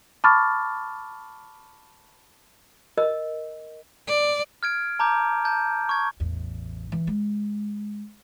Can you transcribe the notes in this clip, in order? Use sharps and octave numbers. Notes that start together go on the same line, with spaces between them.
A5 B5 C#6 D6 F6 A6
A#4 D#5
D5
F6 G#6 D7
A5 A#5 D6 G6
A5 G6
C#6 G#6
A1 E2
E3
G#3